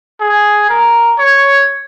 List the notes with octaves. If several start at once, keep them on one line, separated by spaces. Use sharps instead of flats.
G#4
A#4
C#5